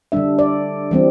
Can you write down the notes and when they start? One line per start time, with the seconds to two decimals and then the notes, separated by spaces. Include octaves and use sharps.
0.12 D3 G3 D4 E5
0.39 D5
0.91 E3 G3 C4